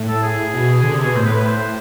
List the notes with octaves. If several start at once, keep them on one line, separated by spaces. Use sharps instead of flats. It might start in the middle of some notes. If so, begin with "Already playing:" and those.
Already playing: A2
A4
G#4
B2
D3
C3
B2
A2 C5
B4
B4
C5